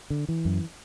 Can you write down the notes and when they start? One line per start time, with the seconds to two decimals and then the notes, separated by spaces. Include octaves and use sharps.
0.10 D3
0.29 E3
0.45 F#2